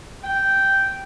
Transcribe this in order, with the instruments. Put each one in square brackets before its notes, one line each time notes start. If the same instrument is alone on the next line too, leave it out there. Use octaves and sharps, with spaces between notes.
[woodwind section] G5